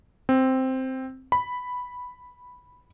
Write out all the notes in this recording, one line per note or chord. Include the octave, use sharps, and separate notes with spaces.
C4
B5